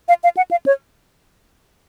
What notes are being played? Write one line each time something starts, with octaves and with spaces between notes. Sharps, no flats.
F5
F5
F#5
F5
C#5